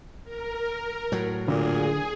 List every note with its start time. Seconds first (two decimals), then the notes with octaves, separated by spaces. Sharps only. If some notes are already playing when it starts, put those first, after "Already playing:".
0.24 A#4
1.12 A2 F#3
1.48 A#2 D3 G#4